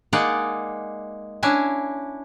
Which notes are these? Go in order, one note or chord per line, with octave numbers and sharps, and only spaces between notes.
G#3 A#3 D#4 G#4 D5 F#5
C#4 D4 E4 G#5